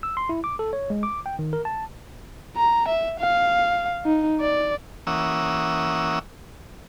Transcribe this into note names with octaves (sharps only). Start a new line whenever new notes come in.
E6
C6
E4
D6
A4
C#5
G#3
D6
G5
D#3
A#4
A5
A#5
E5
F5
D#4
D5
E3 A#3 C#4 F#5 D#6 E6